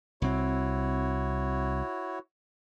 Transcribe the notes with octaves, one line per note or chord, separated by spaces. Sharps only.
C2 C4 E4 F#4 C#5